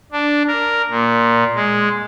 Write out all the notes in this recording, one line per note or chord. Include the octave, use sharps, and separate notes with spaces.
D4
A#4
A#2
G#3